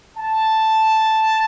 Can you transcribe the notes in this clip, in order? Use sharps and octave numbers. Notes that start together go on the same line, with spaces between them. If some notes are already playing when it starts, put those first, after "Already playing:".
A5